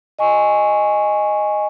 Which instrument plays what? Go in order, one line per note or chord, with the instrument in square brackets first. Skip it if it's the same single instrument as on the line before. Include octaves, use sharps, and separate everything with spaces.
[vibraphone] D#5 G#5 C#6